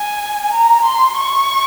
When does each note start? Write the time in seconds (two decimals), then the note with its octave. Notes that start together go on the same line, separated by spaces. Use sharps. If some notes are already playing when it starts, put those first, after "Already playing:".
Already playing: G#5
0.53 A#5
0.85 C6
1.17 C#6